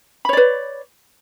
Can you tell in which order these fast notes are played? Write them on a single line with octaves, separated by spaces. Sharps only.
B5 C#5 D5 B4